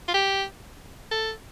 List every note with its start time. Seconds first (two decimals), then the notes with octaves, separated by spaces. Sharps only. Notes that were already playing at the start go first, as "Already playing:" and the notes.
0.08 F4
0.14 G4
1.11 A4